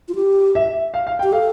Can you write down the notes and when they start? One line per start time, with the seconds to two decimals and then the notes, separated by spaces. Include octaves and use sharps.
0.08 F4
0.15 G4
0.55 E5
0.94 F5
1.07 F5
1.19 G5
1.23 G4
1.32 A4 F5